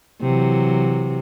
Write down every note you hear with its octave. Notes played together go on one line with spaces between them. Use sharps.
C3 E3 F#3